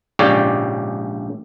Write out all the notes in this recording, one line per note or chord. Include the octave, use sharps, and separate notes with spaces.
A#1 G#2 C#3 G4 C#5 D5